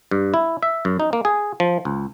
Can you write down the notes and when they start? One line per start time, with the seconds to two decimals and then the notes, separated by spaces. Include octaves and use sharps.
0.11 G2
0.34 E4
0.63 E5
0.85 F#2
1.00 D#4
1.13 A#3
1.25 G#4
1.60 F3
1.85 C#2